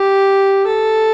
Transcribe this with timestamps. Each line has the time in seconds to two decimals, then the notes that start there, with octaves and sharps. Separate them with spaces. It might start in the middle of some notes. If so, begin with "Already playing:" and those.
Already playing: G4
0.66 A4